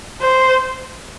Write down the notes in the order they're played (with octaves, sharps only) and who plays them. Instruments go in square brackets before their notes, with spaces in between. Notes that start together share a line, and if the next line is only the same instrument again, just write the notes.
[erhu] C5